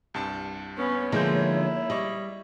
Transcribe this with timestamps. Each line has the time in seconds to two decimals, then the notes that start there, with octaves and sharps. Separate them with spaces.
0.14 C2 G2 A5
0.77 B3 C#4 C#5
1.12 D3 F3 G#3 A#3 D#4 E4 G6
1.90 G3 D#5 C#6